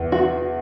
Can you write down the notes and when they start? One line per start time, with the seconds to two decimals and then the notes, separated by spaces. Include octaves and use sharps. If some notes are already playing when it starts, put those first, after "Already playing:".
Already playing: E2
0.12 F#4